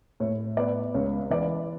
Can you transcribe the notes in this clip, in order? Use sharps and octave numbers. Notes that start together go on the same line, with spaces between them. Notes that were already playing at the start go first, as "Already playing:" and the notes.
A2 C#5
B3 D5
C#2 C#5
E3 D5